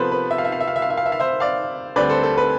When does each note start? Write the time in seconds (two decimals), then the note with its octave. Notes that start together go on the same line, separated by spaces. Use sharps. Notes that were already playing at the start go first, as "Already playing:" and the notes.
Already playing: C3 F3 B3 A4 B4 C5
0.11 B4
0.31 E5
0.38 F5
0.45 E5
0.52 F5
0.61 E5
0.68 F5
0.76 E5
0.82 F5
0.90 E5
0.97 F5
1.06 E5
1.12 F5
1.20 C5 E5
1.40 D5 F5
1.96 D2 D3 G3 C4 B4 D5
2.09 A4 C5
2.23 A4
2.37 B4